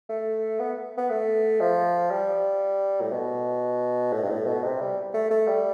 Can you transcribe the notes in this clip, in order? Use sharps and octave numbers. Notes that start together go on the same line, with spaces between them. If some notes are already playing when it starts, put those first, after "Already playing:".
A3
B3
B3
A3
F3
G3
A2
B2
A2
G2
A2
B2
C3
G3
A3
A3
G3